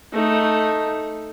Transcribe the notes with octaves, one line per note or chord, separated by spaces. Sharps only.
A3 D#4